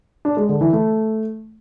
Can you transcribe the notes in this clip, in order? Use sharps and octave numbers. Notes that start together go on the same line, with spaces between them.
D4
G#3
D3
E3
A3